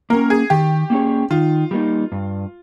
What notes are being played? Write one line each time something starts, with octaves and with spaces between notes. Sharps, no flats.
A#3 C#4 A#4
G#4
D#3 G4
A#3 C#4 G#4 C#5
D#3 F4
G3 A#3 D#4
G2